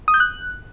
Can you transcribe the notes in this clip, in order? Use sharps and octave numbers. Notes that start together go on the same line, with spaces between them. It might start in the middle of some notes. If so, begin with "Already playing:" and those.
D#6
G6
F#6